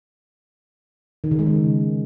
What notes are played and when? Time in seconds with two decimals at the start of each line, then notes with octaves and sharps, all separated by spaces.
1.24 D#3
1.31 C#3
1.39 G#3
1.46 D#3